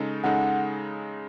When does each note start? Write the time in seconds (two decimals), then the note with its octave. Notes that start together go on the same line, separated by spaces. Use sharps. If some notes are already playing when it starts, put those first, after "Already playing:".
Already playing: C#3 G#3 D#4 A4
0.24 C#3 G#3 D#4 A4 F#5